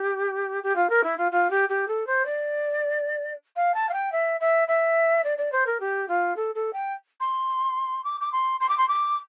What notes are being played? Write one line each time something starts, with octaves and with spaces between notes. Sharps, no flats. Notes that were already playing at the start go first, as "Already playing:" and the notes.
Already playing: G4
G4
F4
A#4
E4
F4
F4
G4
G4
A4
C5
D5
F5
A5
F5
G5
E5
E5
E5
D5
D5
C5
A#4
G4
F4
A4
A4
G5
C6
D6
D6
C6
C6
D6
C6
D6